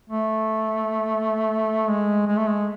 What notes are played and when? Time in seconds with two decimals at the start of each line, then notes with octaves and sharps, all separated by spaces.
0.10 A3
1.89 G#3
2.27 G#3
2.37 A3
2.47 G#3